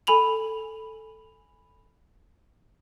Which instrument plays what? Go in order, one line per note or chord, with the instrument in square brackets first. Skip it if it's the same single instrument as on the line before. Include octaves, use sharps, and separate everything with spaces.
[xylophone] A4 G#5 B5 F7 F#7